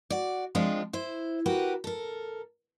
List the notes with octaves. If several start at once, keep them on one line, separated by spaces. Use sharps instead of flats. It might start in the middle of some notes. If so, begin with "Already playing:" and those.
F#4 D5
F3 G#3 C4 D4 F4
E4 C5
F#4 G4 A#4 B4
A4 A#4